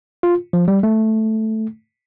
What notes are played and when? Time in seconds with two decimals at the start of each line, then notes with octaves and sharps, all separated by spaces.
0.23 F4
0.53 F3
0.68 G3
0.83 A3